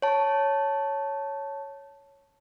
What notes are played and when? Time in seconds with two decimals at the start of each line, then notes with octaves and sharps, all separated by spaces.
0.02 C#5 A5